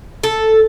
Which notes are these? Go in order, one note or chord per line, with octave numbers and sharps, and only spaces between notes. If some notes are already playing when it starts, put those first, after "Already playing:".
A4